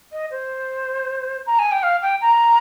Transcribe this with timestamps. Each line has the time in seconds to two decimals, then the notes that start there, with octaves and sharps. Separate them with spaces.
0.12 D#5
0.31 C5
1.47 A#5
1.59 G#5
1.72 G5
1.83 F5
2.02 G5
2.21 A#5